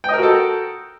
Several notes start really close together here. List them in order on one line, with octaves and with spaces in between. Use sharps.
G5 D#5 A#4 F#4 A4